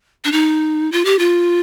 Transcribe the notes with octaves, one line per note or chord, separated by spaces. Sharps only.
D4
D#4
F4
G4
F4